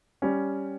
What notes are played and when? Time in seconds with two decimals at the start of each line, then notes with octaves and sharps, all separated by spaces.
0.22 G3 C#4